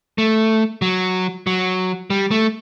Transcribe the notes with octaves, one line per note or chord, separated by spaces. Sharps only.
A3
F#3
F#3
G3
A3